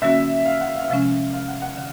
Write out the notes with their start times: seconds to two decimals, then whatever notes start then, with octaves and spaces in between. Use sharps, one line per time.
0.02 D3 F#3 A#3 C#4 F#4 E5
0.45 F5
0.61 F#5
0.76 F5
0.84 E5
0.90 C3 F3 G#3 C#4 F5
1.34 F5
1.48 F#5
1.62 F#5
1.77 D3 F5